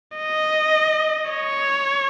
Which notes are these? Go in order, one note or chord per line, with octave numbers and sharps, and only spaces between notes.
D#5
C#5